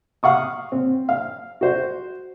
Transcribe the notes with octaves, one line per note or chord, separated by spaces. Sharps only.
F5 F#5 C#6 D#6
C4
F5
F#4 C5